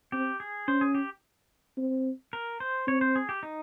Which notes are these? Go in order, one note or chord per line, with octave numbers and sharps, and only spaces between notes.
C4 G4
G#4
C#4 C5
G#4
G4
C4
A#4
C5
C4 C#5
C5
G#4
G4
D#4